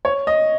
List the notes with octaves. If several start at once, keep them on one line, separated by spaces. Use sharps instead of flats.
C#5
D#5